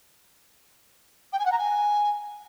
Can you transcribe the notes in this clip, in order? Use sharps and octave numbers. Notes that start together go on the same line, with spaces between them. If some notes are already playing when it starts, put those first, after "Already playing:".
G5
G#5
F#5
A#5
G#5